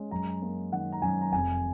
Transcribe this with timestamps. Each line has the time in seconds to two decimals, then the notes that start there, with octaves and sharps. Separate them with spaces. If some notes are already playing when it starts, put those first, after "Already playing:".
Already playing: G#3 C#4
0.11 F#2 A#5
0.42 A#3
0.72 D#3 F#5
0.92 A#5
1.02 F#2 G#5
1.21 A#5
1.32 F1 G#5